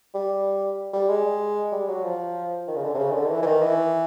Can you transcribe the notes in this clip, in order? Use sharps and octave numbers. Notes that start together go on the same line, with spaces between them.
G3
G3
G#3
G3
F#3
F3
D#3
C#3
D3
C3
C#3
D#3
D3
D#3
E3
E3
D#3
E3